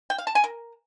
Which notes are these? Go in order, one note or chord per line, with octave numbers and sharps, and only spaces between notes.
G5
F5
A5
G#5
A#4